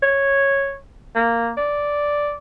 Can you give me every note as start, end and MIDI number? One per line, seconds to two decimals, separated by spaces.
0.03 0.76 73
1.16 1.52 58
1.58 2.33 74